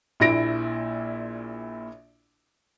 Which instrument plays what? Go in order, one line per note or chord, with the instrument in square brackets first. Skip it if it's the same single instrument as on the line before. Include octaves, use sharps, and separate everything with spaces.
[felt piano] A#1 A#2 E4 A#6 D7